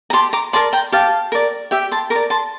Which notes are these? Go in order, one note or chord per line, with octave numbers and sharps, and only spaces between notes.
A#5
G4 A5 C6
A#5 D6
A#4 D5 A5 C6
G5 A#5
G4 F5 A5
A#4 D5
G4 E5 G5
A5 C6
A#4 A#5 D6
D5
A5 C6